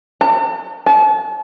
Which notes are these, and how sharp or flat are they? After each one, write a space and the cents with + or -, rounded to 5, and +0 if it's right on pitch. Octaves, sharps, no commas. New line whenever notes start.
A5 +45
A5 -35